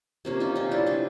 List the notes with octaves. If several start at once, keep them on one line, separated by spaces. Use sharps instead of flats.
C3 F3 A#3 C#4
D#4 F4
C#4 D#4
D4 E4
D#4 F4